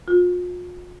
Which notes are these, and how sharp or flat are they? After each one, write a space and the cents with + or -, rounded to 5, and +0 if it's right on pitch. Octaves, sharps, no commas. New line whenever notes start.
F4 +40